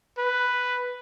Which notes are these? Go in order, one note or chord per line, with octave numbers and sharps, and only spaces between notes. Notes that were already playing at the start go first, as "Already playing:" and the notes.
B4